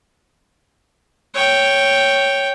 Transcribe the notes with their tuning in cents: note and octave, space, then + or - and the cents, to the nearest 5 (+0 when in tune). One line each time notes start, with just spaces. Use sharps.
C#5 +0 G5 +0